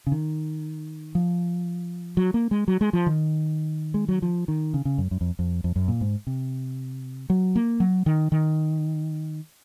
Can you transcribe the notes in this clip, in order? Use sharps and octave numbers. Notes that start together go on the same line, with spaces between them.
C#3
D#3
F3
F#3
A#3
G#3
F#3
G#3
F3
D#3
G#3
F#3
F3
D#3
C#3
C#3
F#2
F#2
F2
F2
F2
F#2
A#2
G#2
C3
F#3
A#3
F#3
D#3
D#3